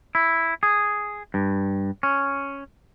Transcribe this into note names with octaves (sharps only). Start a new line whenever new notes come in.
E4
G#4
G2
C#4